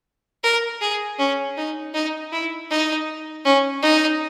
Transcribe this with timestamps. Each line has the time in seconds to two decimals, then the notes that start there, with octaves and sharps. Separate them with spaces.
0.43 A#4
0.81 G#4
1.19 C#4
1.57 D#4
1.94 D#4
2.32 E4
2.71 D#4
3.45 C#4
3.82 D#4